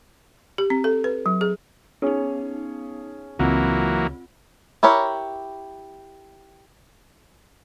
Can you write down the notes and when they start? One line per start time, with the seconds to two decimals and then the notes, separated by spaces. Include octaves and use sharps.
0.58 G4
0.70 C4
0.84 A4
1.04 B4
1.26 F#3
1.41 G#4
2.02 B3 C#4 D#4 G#4
3.39 C#2 E3 F#3 A#3 C4 F4
4.83 E4 G4 A#4 C#5